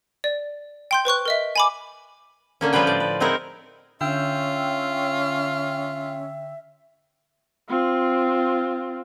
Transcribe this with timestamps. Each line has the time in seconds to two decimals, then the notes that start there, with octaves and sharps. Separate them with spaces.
0.24 D5
0.91 G5 C6 G6
1.05 B4 C5 C#6 F#6
1.25 A#4 D#5 E5
1.56 G#5 B5 D6
2.61 D3 A#3 C#4
2.73 F3 G3 F4 B4 G5
2.87 A2 D5
3.00 B4
3.20 G#3 C4 D#4 E4 A#4 F#5
4.01 D3 C#4 F4 E5 G5 E6
7.69 C4 F4